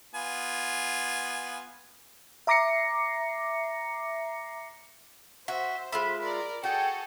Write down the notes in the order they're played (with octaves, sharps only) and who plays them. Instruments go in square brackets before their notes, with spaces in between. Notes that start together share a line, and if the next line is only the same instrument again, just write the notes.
[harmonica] B3 F4 G#5
[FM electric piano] E5 A#5 D6 A#6 C7 C#7
[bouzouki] F#4 [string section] C5 [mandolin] E5
[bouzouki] G#3 F4 E5 [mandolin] B5
[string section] A#4 D5
[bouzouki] F#4 [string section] G#4 A4 [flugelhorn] G5